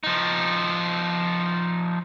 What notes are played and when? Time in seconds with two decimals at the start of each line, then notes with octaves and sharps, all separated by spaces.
0.04 F3 D#4